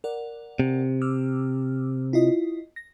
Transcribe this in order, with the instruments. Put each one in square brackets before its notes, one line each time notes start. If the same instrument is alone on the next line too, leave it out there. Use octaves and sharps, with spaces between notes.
[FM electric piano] A#4 D5 F#5
[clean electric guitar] C3
[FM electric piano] D6 E6 F6
E4 F4 D#5
A#6